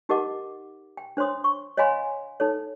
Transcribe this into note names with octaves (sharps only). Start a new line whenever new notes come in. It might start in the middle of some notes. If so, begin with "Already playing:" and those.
D#4 G4 A#4 D#5 F#5 D6
G5
D4 C5 C#5 C6 D#6
C#6
C#5 D#5 F5 G#5 B5 C6
D#4 A4 C#5